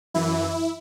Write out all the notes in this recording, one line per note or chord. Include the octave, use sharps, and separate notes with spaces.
F#2 E3 E4